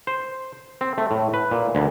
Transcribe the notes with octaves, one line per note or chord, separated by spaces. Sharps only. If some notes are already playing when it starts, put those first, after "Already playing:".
C5
C4
A3
A2
B4
A#2
D2